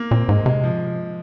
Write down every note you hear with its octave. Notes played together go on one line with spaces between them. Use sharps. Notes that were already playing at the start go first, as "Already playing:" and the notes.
Already playing: A#3
A#2 C4
G#2 G#3
C3 G#3
F3